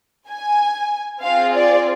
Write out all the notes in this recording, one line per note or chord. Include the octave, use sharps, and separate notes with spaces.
G#5
C4 F4 G#4 F5
D5